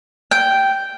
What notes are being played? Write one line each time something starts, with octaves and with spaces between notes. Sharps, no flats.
G5